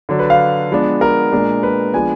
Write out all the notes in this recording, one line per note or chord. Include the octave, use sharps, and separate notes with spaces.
D3 F#3 D4
B4
F5
F3 G#3 B3 D4
A#4
A#2 G#3 D4
B4
F3 G#3 B3 D4 G#5